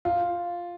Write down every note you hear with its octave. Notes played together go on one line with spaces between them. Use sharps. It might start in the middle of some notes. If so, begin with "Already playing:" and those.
F4